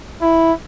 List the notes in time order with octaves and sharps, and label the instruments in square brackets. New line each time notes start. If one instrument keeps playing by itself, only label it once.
[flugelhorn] E4